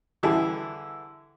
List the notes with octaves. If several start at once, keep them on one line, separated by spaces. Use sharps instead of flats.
D3 E3 G3 E4 G#4 A4